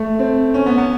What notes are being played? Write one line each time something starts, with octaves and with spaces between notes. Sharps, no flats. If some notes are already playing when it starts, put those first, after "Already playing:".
Already playing: A3
C4
C#4
B3
B3